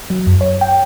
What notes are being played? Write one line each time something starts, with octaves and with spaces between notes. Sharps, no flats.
F#3
F#2
C#5
G5